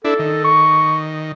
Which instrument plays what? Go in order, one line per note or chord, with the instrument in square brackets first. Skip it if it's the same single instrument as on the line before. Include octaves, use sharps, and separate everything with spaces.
[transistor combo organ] D4 E4 [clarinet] A4
[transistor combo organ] D#3
[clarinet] C#6